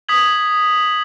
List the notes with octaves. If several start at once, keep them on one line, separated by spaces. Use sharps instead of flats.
D#6 G#6 B6 F#7